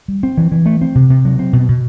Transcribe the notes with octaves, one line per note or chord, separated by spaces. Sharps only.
G3
C4
E3
E3
A3
C4
C3
C3
F#3
C4
B2
B2